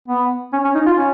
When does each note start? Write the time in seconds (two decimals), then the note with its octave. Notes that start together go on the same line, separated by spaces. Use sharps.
0.09 B3
0.53 C#4
0.64 C#4
0.75 D#4
0.86 F4
0.98 C#4